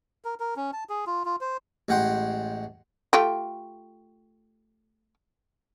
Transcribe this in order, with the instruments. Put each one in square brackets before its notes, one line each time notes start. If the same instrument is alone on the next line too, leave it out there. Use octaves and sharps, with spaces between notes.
[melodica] A#4
A#4
C#4
A5
G#4
F4
F4
C5
[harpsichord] A1 G#3 F#5 G5 C6
[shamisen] A3 F4 G4